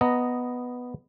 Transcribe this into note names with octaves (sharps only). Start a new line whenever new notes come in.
B3 D#5 A#5